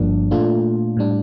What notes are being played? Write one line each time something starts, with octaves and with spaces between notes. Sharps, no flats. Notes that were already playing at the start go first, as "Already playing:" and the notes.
Already playing: G1 G2 F3 A#3 D4
A#2 A3 D4 F4
A2 G3 D4